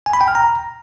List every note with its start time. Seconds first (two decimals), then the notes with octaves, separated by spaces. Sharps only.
0.06 G#5
0.13 B5
0.21 G5
0.28 F6
0.35 A#5